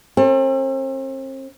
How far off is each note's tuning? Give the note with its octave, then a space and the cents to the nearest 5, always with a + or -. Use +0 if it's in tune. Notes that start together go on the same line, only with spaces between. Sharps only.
C4 +40 A4 +35